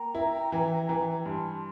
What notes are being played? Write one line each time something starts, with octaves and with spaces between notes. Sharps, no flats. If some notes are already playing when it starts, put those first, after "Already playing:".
Already playing: A#3 G5 A#5
E4
E3
E3
G2 A5 C6